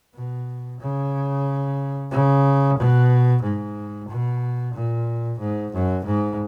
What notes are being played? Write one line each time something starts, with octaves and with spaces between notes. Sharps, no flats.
B2
C#3
C#3
B2
G#2
B2
A#2
G#2
F#2
G#2